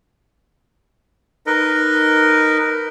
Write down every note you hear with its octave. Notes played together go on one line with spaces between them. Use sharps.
D#4 A#4 B4 D#5